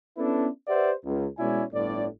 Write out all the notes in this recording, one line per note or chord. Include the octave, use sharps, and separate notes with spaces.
B3 C#4 D4 E4 A4 B4
G4 B4 C5 D5 E5 F#5
C#2
B2 G#3 C#4 E4 D5 G#5
G1 A2 D5